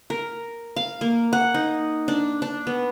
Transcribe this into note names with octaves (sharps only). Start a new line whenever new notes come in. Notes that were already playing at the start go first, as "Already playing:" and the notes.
A#4
F5
A#3
F#5
D#4
D4
D4
B3